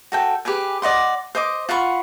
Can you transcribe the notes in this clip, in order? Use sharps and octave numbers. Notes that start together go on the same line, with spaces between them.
F#4 A4 G5
G4 G#4 B4 G#5
D5 D#5 F#5 C6
C5 D#5 D6
F4 F#5 B5 C#6